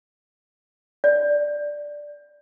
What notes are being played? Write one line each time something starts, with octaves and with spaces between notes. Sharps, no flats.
D5